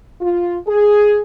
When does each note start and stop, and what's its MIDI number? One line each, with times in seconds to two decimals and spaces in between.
0.21 0.57 65
0.67 1.20 68